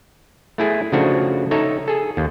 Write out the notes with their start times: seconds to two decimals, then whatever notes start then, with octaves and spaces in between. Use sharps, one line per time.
0.58 A3 E4 G#4
0.92 C#3 F3 A3 D4 F#4
1.51 D#4 A4 C#5 E5
1.88 G#4 A4
2.17 D#2